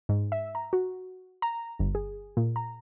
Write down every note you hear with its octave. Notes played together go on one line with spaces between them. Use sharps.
G#2
E5
A#5
F#4
A#5
G1
G#4
A#2
A#5